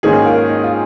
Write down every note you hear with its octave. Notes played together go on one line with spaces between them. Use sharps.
G#2 D#3 A#3 C#4 D#4 G#4
F4 A#4
D#4
F4